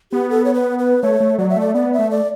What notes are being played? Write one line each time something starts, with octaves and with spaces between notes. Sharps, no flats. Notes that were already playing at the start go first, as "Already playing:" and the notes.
B3 G4
A4
C#5
B4
B4
A3 C#5
A3
F#3 D5
E5
A3 D5
B3 D5
E5
A3
D5